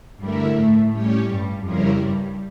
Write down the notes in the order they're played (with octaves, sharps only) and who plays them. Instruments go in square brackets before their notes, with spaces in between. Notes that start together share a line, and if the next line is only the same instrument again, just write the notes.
[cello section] G2 G3 [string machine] D3 A3 E4 A#4 E5
[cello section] A2 A3
[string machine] A2 G3 C#4 G4 C#5
[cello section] G2 G3
[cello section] F2 F3 [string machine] C#3 G3 C#4 E4 A#4
[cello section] G2 G3